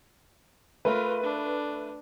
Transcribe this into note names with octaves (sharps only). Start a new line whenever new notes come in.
A3 F4 A#4 B4
D4